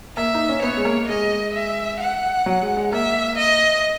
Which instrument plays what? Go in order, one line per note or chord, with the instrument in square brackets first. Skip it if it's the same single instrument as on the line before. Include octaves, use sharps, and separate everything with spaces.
[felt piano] A#3 [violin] E5
[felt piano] D#4
C#4
[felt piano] B3 [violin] C#5
[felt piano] G#3
A#3
[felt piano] G#3 [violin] D#5
[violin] E5
F#5
[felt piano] F#3
G#3
G#3
[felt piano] A#3 [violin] E5
[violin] D#5